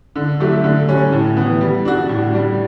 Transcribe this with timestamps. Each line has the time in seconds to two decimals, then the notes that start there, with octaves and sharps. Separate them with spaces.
0.16 D3
0.40 F#3 A3 E4 G4
0.64 D3
0.89 G3 C#4
1.13 A2
1.37 E3 B3
1.61 G3
1.85 D4 F#4
2.09 A2
2.33 G3 D4